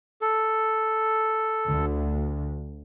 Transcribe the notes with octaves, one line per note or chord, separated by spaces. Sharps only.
A4
D2